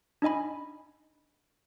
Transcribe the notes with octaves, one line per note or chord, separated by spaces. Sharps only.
D4 D#4 D#5 G#5 B5